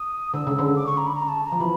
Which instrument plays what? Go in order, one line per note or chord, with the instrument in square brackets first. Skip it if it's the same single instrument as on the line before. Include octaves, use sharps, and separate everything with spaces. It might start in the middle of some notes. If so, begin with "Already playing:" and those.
Already playing: [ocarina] D#6
[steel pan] D3 [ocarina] E6
[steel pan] C#3
D3
[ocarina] D6
C#6
A#5
B5
A#5
A5
A#5
[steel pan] F3
[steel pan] E3 [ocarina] B5